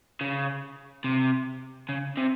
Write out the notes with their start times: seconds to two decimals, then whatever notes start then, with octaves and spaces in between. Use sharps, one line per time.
0.21 C#3
1.04 C3
1.89 C#3
2.17 C3